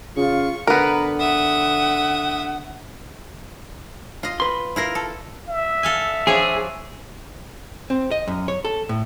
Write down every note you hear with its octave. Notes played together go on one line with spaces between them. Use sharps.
C#3 F4 C#6
D3 B3 A#4 B4 A#5
E5 F#5 D#6
F4 D#5
B4 C6
E4 F4 A#4
A4
E5
A4 F5 G#5
F3 D4 G#4 C#5
C4
D#5
F#2
C#5
A4
A2